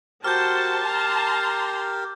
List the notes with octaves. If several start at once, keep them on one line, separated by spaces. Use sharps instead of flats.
F#4 G4 A#4 C5 A5 F6 G6
A#5 C6